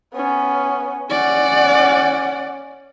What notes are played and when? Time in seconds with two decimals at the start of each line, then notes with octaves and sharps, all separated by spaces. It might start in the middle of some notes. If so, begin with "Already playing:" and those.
0.15 B3 C#4
1.10 C#4 D5 F#5